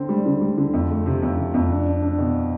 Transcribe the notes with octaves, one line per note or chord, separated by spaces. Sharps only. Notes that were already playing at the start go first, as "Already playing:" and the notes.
Already playing: D3 C4
G3
D3
G3
D3
F2
A3
C3
F2
C3
F2
D4
D4
D4
B2